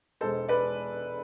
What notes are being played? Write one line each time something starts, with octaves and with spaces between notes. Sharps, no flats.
E1 E2 B2 G#3 A4 C5
B4 D5